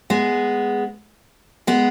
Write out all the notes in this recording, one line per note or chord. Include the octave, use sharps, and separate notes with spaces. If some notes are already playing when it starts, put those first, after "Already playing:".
G#3 B3
G#3 B3